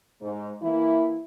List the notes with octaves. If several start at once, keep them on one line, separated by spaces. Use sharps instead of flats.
G#2
E3 A#3 E4